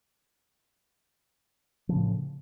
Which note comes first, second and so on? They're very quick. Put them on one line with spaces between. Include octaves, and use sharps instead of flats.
F3 C#3 A2